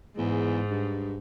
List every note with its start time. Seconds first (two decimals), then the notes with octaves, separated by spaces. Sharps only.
0.17 E2 G#2
0.70 G2